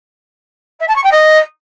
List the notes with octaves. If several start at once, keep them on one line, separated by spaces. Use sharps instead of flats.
E5
A5
C#6
G5
D#5